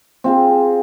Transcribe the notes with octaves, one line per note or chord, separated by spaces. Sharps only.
C4 F4 G#4